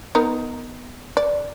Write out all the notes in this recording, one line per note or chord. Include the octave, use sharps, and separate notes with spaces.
B3 D#4 A#4
D5